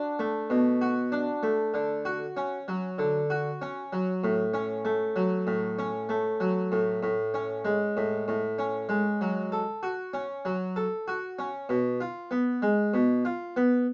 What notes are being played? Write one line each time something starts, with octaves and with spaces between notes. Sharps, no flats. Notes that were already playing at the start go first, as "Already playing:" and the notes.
Already playing: D4 F#4
A3
B2
F#4
D4
A3
D3
F#4
C#4
F#3
D3
F#4
C#4
F#3
A2
C#4
A3
F#3
A2
C#4
A3
F#3
A2
A2
C#4
G#3
A2
A2
C#4
G#3
F#3
A4
F#4
C#4
F#3
A4
F#4
C#4
B2
F4
B3
G#3
B2
F4
B3